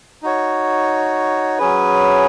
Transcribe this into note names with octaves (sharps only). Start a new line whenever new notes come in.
D#4 F#4 C#5
F#3 C#4 G#4 B4